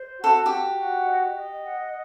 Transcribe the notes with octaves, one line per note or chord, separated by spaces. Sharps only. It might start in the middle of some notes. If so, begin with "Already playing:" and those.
Already playing: C5
F#4
A4
F#4 G4
F#4
D#5
D#5
F#5